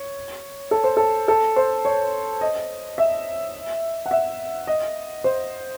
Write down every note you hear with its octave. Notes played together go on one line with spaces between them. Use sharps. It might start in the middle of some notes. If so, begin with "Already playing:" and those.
Already playing: C#5
A4
C5
A4
A4
C5
C#5
D#5
E5
F#5
E5
D#5
C5